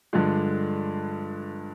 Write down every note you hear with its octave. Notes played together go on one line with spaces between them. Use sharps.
G2 D3 F3 G#3